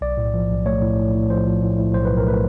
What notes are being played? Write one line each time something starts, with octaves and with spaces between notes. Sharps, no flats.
B1 D5
A2
F3
B1
A3 C#5
A2
A2
A2
F3 C5
F3
A2
A2
B1 C5
B4
B1
A#4
A3 B4